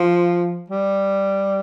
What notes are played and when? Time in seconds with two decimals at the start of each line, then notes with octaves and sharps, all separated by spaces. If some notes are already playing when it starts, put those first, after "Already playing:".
Already playing: F3
0.70 G3